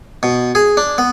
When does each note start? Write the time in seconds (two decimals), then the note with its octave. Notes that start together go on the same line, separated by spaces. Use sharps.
0.23 B2
0.55 G#4
0.77 D4
0.98 B3